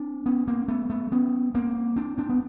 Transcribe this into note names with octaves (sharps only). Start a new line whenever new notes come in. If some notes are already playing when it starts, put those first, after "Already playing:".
Already playing: C4 D4
B3 C#4
A#3 C4
A3 B3
A3 B3
B3 C#4
A#3 C4
C4 D4
C4 D4
B3